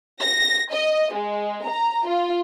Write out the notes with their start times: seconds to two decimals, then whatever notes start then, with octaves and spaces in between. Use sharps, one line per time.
0.21 A#6
0.72 D#5
1.14 G#3
1.66 A#5
2.08 F4